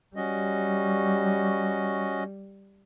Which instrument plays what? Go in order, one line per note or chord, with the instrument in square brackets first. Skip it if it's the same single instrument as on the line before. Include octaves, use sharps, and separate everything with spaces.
[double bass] G3 [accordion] C#4 F#4 D#5